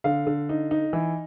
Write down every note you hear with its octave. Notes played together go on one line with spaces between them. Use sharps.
D3 F5
D3
D#4
D#4
E3